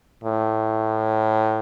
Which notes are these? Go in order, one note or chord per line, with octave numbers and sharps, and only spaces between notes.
A2